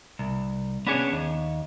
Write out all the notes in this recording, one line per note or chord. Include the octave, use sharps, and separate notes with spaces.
C2
B3 C#4 D4 G#4 C#5
D#2